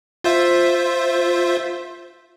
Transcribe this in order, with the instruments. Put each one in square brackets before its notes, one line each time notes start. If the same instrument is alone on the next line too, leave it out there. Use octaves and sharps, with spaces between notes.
[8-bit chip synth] F4 C5 E5